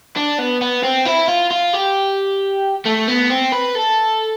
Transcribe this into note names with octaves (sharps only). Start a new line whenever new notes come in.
D4
B3
B3
C4
E4
F4
F4
G4
A3
B3
C4
B4
A4